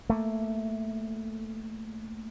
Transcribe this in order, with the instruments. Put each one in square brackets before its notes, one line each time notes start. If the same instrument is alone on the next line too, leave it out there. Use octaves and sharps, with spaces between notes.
[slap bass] A3 A#3